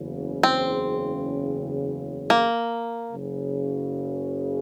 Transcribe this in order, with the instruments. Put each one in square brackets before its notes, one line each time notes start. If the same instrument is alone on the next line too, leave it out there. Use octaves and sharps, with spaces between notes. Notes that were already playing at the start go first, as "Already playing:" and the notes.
Already playing: [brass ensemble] F#1 E2 C#3
[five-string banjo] C4
A#3
[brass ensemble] F#1 F#2 C#3